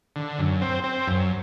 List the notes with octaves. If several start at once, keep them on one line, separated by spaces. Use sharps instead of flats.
D3
F#2
C4
C4
F#2